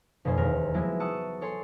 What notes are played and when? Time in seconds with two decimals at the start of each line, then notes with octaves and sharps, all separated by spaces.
0.25 F1 B2 F4 C5 G#5
0.37 E1 D#2 A#4 F6
0.74 F3 F#3 G#3 A#3 B3 E4
1.00 F#5 A5 C#6 D#6 E6
1.41 A4 C#5 G#5 C6